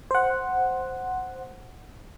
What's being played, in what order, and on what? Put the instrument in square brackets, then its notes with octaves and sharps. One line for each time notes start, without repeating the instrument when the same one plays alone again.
[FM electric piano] C5 F#5